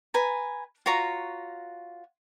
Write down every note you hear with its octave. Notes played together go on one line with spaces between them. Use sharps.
B4 G#5 A#5
F4 F#4 C#5 A#5